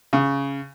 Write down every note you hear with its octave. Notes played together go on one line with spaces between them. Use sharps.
C#3